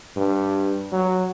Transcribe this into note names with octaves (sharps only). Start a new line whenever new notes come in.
G2
F#3